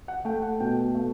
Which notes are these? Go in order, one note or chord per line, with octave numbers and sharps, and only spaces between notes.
F#5
A3 G5
F#5
B2 G5
A3